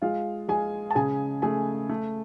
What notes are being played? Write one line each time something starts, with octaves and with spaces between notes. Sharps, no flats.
G#3 F4 F5
G#3 G#4 G#5
A5
C#3 G#4 G#5
A3 G#4 G#5
A3